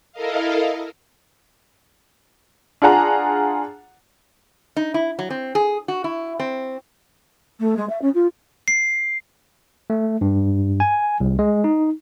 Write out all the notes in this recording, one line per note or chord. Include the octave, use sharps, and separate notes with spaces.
E4 A4 A#4 D#5 F5
D4 F4 G#4 F#5 A#5
D#4
E4
F#3
C4
G#4
F#4
E4
C4
A3
G#3
E5
C#4
F4
C7
A3
G2
G#5
C2
G#3
D#4